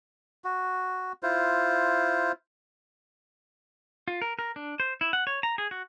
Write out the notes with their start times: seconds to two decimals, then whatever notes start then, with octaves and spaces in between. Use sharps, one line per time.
0.44 F#4
1.23 E4 F4 C5
4.08 F4
4.22 A#4
4.39 A#4
4.56 D4
4.80 C5
5.01 E4
5.13 F#5
5.27 C#5
5.43 A#5
5.58 G#4
5.71 F#4